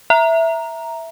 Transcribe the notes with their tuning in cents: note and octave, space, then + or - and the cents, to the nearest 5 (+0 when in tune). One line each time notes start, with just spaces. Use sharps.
E5 +0 A#5 +0